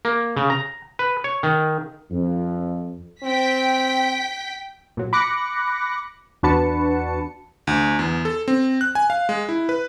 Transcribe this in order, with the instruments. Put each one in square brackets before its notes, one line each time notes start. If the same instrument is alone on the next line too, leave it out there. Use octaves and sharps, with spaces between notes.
[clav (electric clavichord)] A#3
C#3
A#5
B4
C#5
D#3
[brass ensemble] F2
[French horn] C4 [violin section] G5 B6
[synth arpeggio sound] A#2 F#3
B5 D6 F#6 A#6 C#7
E2 D4 F#4 B4 A5 C#7
[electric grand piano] D2
E2
A4
C4
F#6
G#5
F5
G#3
E4
B4